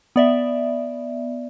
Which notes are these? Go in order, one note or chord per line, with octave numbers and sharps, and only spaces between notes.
B3 D5 E5